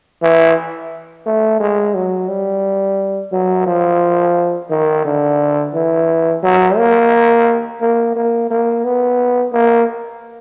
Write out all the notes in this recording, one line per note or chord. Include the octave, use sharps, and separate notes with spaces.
E3
A3
G#3
F#3
G3
F#3
F3
D#3
D3
E3
F#3
A#3
A#3
A#3
A#3
B3
A#3